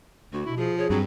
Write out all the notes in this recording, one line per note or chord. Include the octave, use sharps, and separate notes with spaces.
D2 F#4
B2 E4
F3 G#4
G#4 C#5
G2 F#3 C4